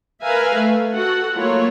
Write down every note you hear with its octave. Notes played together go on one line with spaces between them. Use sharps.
A#4 B4 E5 F5 G#5 A#5
A3
F#4 A4 F#5
F#3 A3 A#3 E4 F4 C#5